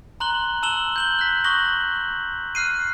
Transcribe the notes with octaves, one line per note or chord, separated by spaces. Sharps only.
A#5 C6 F#6 F#7 G7
A5 E6 E7 F#7 G7
G6 F#7 G7
F#6 B6
C#6 D#6 F#6 A#6 F#7 G7
F6 F#6 C7 D#7